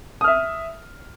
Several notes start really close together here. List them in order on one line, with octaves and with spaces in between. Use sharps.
D#6 F6 E5